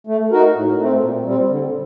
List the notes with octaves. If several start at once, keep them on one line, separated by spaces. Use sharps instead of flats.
A3
D#4 F#4 A#4
A2
A3 C4
A#2
G3 C4
D3